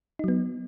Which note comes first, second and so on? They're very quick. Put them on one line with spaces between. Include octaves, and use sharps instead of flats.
D#4 F#3 B3